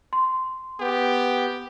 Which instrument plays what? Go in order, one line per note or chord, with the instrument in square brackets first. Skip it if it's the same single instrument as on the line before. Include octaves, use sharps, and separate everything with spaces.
[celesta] C6
[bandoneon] B3 [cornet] G4